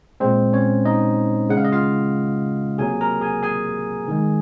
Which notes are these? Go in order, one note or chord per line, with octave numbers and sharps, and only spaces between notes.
A#2 G#3 C4 C5
C#4 C#5
D#4 D#5
C#3 G#3 F#5
F5
D#5
F4 F5
C3 F#3 A#3 G#4 G#5
A#4 A#5
G#4 G#5
G#4 G#5
D#3 G#3